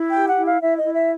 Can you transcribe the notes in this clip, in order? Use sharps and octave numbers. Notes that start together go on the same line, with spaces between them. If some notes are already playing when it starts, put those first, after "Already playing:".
Already playing: E4
G5
G4
F#5
E4
F5
E4 E5
D#5
E4
E5